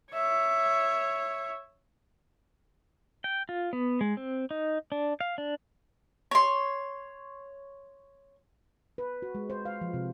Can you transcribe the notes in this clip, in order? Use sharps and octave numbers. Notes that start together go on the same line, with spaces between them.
C#5 E5
G5
F4
B3
G#3
C4
D#4
D4
F5
D4
C#5 C6
B4
F#4
G#3
C5
F5
F3
C3